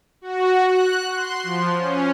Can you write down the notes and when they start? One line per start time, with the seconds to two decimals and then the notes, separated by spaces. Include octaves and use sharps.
0.21 F#4
0.67 F#6
1.15 C6
1.43 F3
1.78 C#4